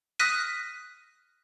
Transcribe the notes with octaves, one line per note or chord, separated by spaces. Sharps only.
D#6 F6 F#6 A#6 B6 D#7